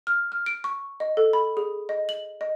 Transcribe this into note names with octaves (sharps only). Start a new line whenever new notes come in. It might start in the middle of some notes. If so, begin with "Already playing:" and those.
F6
F6
D7
C#6
D#5
A4
B5
G#4
D#5
F#7
D#5